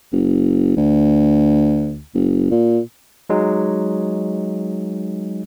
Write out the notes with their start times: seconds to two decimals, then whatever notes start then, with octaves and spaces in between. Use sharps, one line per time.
0.12 F#1
0.76 D2
2.14 F#1
2.51 A#2
3.30 F#3 G#3 D#4